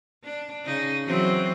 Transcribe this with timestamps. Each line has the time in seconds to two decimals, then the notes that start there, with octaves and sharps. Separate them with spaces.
0.24 D4
0.65 C#3 D#4
1.06 E3 F#3 C4